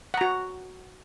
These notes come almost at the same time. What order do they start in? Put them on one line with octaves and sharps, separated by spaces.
F#5 A#5 F#4